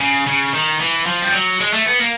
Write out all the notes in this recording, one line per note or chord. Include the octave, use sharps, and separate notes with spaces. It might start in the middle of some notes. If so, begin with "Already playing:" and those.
C#3
C#3
D#3
E3
F3
G3
F#3
G#3
A3
B3
A#3